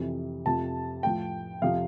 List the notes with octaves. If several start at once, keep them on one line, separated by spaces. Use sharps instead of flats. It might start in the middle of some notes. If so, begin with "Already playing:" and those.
Already playing: F2 C3 E3
F2 C3 F3 A5
A2 F3 G5
F2 C3 F3 F5